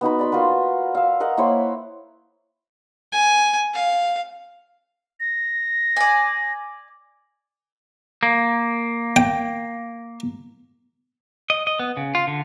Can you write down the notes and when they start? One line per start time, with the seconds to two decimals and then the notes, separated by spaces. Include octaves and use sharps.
0.01 B3 D#4 F#4 B5
0.19 D5 B5 C6
0.32 F4 F#4 A#4 B4
0.95 F5 E6
1.20 A#4 D#5 F#5
1.37 A#3 E4 C5 C#5
3.12 G#5
3.74 F5
5.20 A#6
5.96 D5 G#5
8.23 A#3
9.16 G5
11.50 D#5
11.67 D#5
11.79 B3
11.97 C#3
12.15 F4
12.27 D3